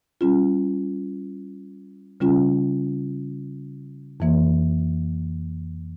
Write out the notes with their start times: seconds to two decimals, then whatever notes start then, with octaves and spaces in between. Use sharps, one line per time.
0.21 G3 C#4 F4
2.20 C#3 G3 C#4 F4
4.20 F2 E3 A#3